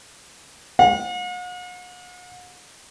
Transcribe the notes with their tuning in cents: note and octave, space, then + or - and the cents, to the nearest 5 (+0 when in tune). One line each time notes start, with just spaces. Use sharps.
F#5 -45